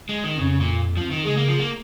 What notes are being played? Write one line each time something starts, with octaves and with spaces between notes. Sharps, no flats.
G#3
D#3
F2 C#3
A#2
F3
D#3
C#3 G#3
A#3
F3
A#3